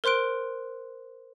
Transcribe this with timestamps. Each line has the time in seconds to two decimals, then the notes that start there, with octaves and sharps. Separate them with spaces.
0.04 A#4 C5 C6 F#6 D7